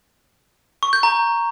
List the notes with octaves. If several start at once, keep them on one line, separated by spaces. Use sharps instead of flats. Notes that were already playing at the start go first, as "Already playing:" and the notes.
C#6
G6
A#5